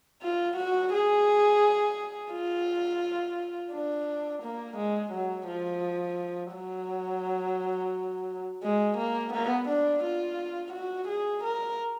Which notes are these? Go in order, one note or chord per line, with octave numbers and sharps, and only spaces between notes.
F4
F#4
G#4
F4
D4
A#3
G#3
F#3
F3
F#3
G#3
A#3
B3
D4
F4
F#4
G#4
A#4